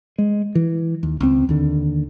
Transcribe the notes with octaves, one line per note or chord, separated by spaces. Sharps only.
G#3
E3
D#2
C#2 C4
D#2 D3